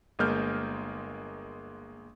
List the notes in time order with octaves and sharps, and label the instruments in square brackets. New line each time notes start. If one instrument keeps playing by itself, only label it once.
[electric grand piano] G1 G#3 A#3 F6 G6